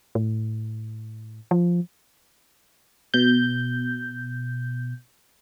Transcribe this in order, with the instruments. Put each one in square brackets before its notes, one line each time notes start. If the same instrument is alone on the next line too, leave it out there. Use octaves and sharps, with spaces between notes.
[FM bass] A2
F3
[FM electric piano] B2 G6